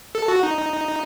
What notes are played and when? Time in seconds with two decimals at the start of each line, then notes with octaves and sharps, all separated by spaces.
0.15 A4
0.28 F#4
0.43 D#4